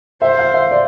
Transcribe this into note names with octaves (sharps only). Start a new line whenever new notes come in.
C5 E5
F5
E5
D5